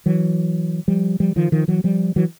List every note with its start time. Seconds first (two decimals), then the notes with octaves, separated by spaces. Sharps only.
0.06 E3 F#3
0.88 F3 G3
1.20 F3 G3
1.36 D#3 F3
1.52 D#3 F3
1.68 E3 F#3
1.84 F3 G3
2.16 E3 F#3